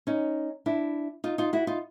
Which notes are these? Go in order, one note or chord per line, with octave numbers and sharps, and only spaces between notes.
C#4 D#4
D4 E4
D#4 F4
D#4 F4
E4 F#4
D#4 F4